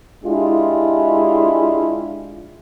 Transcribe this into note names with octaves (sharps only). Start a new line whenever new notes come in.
G#3 D4 E4 F4 G4